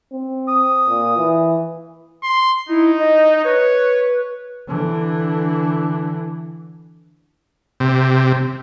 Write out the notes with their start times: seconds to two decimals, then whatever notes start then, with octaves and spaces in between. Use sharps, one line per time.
0.12 C4
0.48 D#6
0.88 A#2
1.17 E3
2.23 C6
2.69 D#4 E4
2.99 D#5
3.45 B4 C#5
4.67 D3 E3
7.80 C3